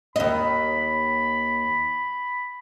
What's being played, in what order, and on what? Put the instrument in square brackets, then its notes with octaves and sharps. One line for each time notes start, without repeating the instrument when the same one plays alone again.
[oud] D#2 D#5 [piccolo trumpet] B5